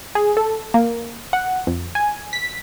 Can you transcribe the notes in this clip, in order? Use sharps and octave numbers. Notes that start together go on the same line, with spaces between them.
G#4
A4
A#3
F#5
F2
G#5
B6